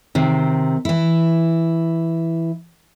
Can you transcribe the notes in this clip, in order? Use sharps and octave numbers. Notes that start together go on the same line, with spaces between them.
C3 D#3 C4
E3 E4